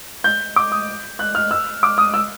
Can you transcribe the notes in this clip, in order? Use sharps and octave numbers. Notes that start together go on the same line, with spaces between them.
G6
D6
D#6
F#6
F6
E6
D6
D#6
E6